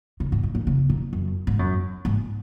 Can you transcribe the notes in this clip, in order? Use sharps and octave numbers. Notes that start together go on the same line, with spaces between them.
C#3
G#2
G#2
A#2
C#3
A#2
F#2
G#2
F#2
G#2